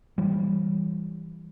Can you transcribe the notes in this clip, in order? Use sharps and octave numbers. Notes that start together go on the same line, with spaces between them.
E3 G3